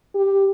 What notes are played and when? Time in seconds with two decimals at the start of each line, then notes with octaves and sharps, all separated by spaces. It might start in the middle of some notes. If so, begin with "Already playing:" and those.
0.15 G4